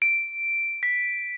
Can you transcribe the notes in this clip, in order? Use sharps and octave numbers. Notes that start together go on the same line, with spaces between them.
D7
B6